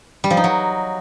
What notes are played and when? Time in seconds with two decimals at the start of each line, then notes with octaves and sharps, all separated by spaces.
0.24 G3
0.30 F3
0.37 D#4
0.44 F#3